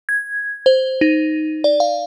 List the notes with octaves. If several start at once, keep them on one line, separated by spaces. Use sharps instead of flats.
G#6
C5
D#4
D5
F5